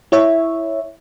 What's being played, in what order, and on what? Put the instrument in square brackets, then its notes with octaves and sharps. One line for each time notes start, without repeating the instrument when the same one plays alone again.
[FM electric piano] E4 C#5 E5